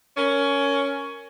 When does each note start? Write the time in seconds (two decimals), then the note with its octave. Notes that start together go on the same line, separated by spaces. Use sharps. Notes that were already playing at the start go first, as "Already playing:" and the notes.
0.17 C#4 A#4